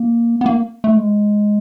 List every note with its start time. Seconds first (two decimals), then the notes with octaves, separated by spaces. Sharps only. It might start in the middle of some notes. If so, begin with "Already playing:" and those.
Already playing: A#3
0.41 B3
0.46 A#3
0.84 A3
0.97 G#3